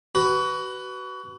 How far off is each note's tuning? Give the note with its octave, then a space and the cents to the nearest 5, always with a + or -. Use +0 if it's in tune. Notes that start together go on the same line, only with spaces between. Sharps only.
F#4 +30 B4 +5